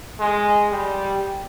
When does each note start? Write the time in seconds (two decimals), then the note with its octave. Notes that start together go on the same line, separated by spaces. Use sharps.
0.20 G#3
0.70 G3